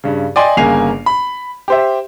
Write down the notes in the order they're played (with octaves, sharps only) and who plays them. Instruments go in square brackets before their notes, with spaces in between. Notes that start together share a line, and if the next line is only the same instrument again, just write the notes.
[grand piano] G2 C#3
D5 D#5 G5 G#5 C6
G1 C#3 A#3 G#5 C7 F7
B5
G4 C5 E5